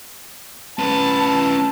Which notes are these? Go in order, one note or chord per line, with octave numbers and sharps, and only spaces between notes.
C#4 B4 A5